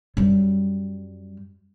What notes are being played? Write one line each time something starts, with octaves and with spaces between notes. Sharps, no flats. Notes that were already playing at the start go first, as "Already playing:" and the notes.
F#2 G3